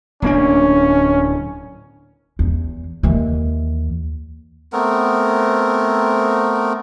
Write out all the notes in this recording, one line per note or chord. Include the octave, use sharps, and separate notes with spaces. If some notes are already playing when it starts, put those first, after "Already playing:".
D1 A#3 C#4 D4
E2
D#2 E3
A3 B3 C4 A#4